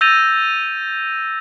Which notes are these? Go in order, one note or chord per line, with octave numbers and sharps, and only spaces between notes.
E6 G6 A6 A#6 D#7 F7